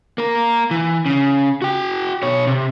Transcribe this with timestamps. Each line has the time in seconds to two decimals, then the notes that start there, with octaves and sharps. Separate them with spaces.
0.18 A#3 A#4
0.71 E3
1.06 C#3
1.62 F#4 G5
2.23 B2 C#5
2.47 C3